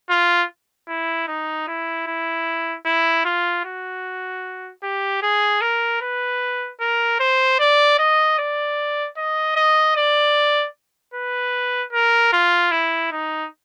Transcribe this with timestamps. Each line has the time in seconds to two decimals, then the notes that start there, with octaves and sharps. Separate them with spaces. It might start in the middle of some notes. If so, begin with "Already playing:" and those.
0.10 F4
0.89 E4
1.28 D#4
1.68 E4
2.07 E4
2.86 E4
3.25 F4
3.65 F#4
4.83 G4
5.23 G#4
5.62 A#4
6.01 B4
6.81 A#4
7.20 C5
7.59 D5
7.99 D#5
8.39 D5
9.17 D#5
9.56 D#5
9.96 D5
11.14 B4
11.93 A#4
12.33 F4
12.72 E4
13.12 D#4